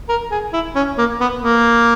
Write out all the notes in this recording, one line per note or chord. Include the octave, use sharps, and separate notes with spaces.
A#4
G#4
E4
C#4
A#3
B3
A#3